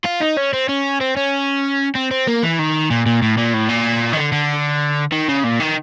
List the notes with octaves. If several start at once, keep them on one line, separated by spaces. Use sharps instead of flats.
F4
D#4
C#4
C4
C#4
C4
C#4
C4
C4
A#3
E3
D#3
A#2
A#2
A2
A#2
A2
A#2
D#3
D3
D3
D#3
C#3
A#2
D#3